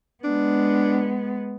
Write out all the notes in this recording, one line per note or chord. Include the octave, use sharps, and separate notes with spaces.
G#3 B3 D4